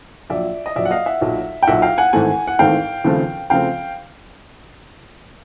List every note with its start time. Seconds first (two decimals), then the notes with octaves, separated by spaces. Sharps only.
0.30 A#1 A#2 F#3 D5 E5
0.66 D#5
0.76 A#1 A#2 F#3 D5 E5
0.85 F#5
0.91 D#5 F5
1.06 E5 F#5
1.21 B1 A#2 F#3
1.63 G5
1.67 B1 A#2 F#3 E5 F#5
1.82 F5 G5
1.98 F#5 G#5
2.13 G#1 G#2 E3 A3 C4 F#5 G#5
2.47 F#5
2.59 G#1 G#2 E3 A3 C4 F5 G5
3.04 D#2 C#3 F3 A3 C4
3.50 C#3 F3 A3 C4 F5 G5